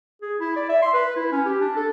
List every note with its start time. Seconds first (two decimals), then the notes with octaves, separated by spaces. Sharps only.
0.22 G#4
0.39 E4
0.56 D5
0.69 E5
0.82 C6
0.94 B4
1.16 E4
1.32 C#4
1.46 G4
1.61 D4
1.77 A4